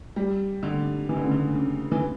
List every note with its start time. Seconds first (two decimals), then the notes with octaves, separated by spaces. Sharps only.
0.16 G3
0.63 D3
1.09 E3
1.16 D3
1.24 C#3
1.31 D3
1.55 C#3
1.92 E3